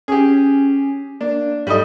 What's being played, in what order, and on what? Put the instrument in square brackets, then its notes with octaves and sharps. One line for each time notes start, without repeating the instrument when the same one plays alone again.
[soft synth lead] C#4 [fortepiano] G4 G#4
[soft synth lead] A#3 [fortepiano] D4
[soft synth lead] G#2 [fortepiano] G3 A3 D#5